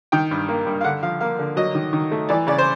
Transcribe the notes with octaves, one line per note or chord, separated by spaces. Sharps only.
D#3 G5
G2
A#3
G2
F5
D3 F#5
F3 F5
A#3 F5
D3
F#3 D#5
D#3
D#3
A3
E3 D5
C#3 D5
C5